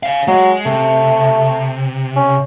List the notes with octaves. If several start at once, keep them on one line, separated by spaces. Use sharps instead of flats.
C#5 F5
F#3 G#3
C3 A3
C#4